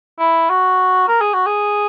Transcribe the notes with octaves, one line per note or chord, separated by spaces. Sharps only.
E4
F#4
A#4
G#4
F#4
G#4